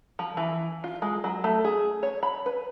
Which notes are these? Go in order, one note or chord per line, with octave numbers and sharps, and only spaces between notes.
F3
E3
F4
G#3
F#3
A3
G#4
C#5
B5
B4